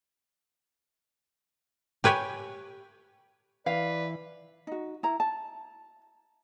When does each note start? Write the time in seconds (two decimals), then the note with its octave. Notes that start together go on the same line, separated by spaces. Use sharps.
2.04 G4 B4 C#5 G5 G#5
3.66 E3 B4 D5 F5
4.67 D#4 F#4
5.03 E4 A#5
5.20 A5